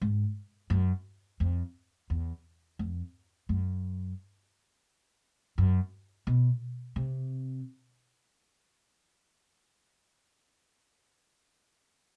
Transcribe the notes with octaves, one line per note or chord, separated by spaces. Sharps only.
G#2
F#2
F2
E2
F2
F#2
F#2
B2
C3